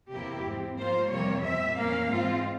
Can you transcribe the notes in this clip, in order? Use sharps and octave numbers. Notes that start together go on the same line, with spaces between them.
E2 C3 E3 A#3 E4 G4
G#2 F3 C4
G#2 F3 A#3 F4 C5
F2 C3 E3 G3 A#3 C#5
A#2 F3 C4 E5
F2 E3 A#3 C#4 F5
G#2 E3 G#3 C4 F4